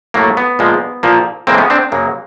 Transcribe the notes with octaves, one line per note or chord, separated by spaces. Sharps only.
A2 F#3 A3 A#3
B3
A#2 F3 G#3
A#2 F3 A#3
A2 E3 G#3 A#3 C4
B3 C#4
C4 D4
F#2 C#3 F#3 A#3